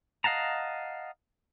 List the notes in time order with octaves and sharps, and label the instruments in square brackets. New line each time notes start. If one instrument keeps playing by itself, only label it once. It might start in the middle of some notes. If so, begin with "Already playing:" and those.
[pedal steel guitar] D#5 F5 F#5 A5 A#5